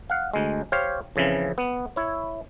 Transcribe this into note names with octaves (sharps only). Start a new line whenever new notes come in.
F5 F#5
D2 G#3
G4 C5 C#5 F5
F2 C#3 E3 F3
B3
E4 C#5